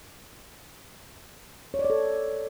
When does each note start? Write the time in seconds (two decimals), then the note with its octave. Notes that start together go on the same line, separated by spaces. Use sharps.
1.74 C#5
1.79 D5
1.84 C#5
1.90 A4